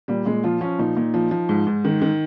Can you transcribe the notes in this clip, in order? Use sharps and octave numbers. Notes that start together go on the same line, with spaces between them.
A#2 G3
A#2 G#3
F3 F4
F3 C#4
A#2 D#4
A#2
F3
F3
G#2
G#2
D#3
D#3